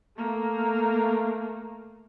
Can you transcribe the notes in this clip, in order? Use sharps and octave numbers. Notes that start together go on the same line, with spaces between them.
A3 A#3